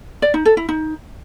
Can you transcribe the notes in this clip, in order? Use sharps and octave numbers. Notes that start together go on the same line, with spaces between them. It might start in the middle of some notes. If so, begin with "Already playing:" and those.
D5
D#4
A4
E4
D#4